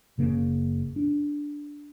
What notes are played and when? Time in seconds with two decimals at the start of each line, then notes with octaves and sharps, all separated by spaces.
0.18 F#1 C#3 A#3 C#4
0.96 D4